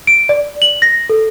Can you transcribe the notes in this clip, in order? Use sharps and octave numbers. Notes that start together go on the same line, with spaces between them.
D7
D5
F#7
A#6
A4